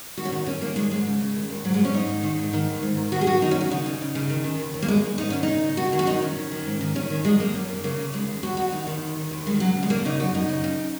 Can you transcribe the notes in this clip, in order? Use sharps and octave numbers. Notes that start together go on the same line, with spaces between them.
D#3 F#4
C#4
D#3 D#4
D#3 C#4
D#3 A#3
D#3 G#3
G#2 G#3
C#3
C#3
D#2
D#2
G#2 F#3
G#3
G#2
C#4
G#2 D#4
D#3
D#3
G#2
D#3
D#2
G#2
D#3
D#3 F#4
G#4
F#2 F#4
D#3 D#4
C#4
D#2 F#4
C#3 D#4
C#3
C#3
C#3
D#3
D#3
D#2
D#2
A#3
D#2 G#3
D#3
G#2 D#4
D#3 C#4
C#3 D#4
C#3
D#3 F#4
D#3 G#4
F#4
F#2 D#4
D#3 C#4
D#3
D#3
G#2
D#3
D#3 C#4
D#3
F#2 G#3
F#2 A#3
F#2 C#4
D#3 A#3
C#3 A#3
C#3
D#2 G#3
D#2
D#2 F#4
D#2 F#4
D#2 D#4
D#3
D#2
D#3
D#2
D#3 G#3
C#3 F#3
C#3
G#3
D#2 A#3
C#3 D#4
F#2 F#4
F#2 D#4
C#3
C#3